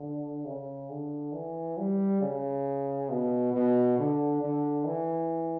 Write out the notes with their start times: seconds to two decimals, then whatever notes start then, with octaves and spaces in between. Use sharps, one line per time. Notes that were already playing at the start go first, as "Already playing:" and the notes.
Already playing: D3
0.45 C#3
0.89 D3
1.33 E3
1.77 G3
2.21 C#3
3.09 B2
3.53 B2
3.98 D3
4.41 D3
4.85 E3